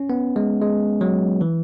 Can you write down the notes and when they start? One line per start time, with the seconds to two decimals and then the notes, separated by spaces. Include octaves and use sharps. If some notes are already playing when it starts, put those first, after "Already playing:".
Already playing: C#4
0.10 B3
0.36 G#3
0.62 G#3
1.01 F#3
1.41 E3